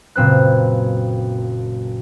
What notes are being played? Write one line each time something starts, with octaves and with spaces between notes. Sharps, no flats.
F#1 A#2 C4 B4 F#6